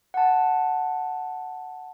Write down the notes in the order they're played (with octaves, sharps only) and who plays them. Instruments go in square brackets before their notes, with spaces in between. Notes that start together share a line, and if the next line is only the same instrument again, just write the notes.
[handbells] F#5 A5